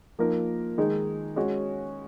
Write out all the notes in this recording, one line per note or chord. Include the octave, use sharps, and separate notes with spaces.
F3 A#3 D#4 A#4
D#3 G#3 D#4 G#4
G#3 C#4 F#4 C#5